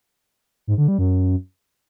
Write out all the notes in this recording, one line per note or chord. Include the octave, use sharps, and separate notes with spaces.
G#2
D3
G3
F#2